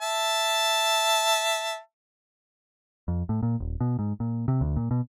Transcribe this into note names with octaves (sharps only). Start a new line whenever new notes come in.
E5 A5
F2
A2
A#2
D#1
B2
G#2
A#2
C3
D2
A#2
B2